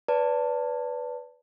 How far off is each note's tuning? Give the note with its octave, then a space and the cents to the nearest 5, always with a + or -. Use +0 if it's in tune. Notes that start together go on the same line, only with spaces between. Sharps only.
B4 +0 D5 -30 A5 +20